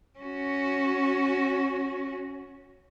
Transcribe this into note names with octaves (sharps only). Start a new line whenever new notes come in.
C#4 F#4